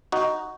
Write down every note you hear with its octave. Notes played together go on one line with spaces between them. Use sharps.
D#4 F#4